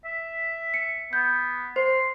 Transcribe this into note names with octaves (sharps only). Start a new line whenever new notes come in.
E5
C#7
B3 G6
C5 C6